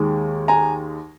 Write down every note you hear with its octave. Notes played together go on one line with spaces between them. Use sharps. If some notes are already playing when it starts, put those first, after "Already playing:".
Already playing: D#2 D#3 G#3
G#5 A#5